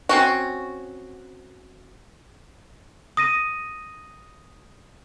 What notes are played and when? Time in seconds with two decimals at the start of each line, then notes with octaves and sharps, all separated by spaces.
0.09 C4 C#4 F#4
3.17 D#6 A#6 D#7